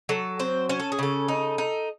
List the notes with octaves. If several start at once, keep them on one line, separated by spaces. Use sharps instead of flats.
F#3 A4
C4 C5
C#4 C5
A4
G#4
C#3 A4
D#4
D#4